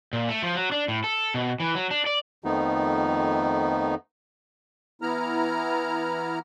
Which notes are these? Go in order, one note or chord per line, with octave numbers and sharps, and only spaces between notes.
A#2
A3
F3
F#3
D4
A2
A4
B2
E3
F#3
D4
D5
F2 D#3 F3 A3 B3 D#4
E3 B3 E4 A#5 F6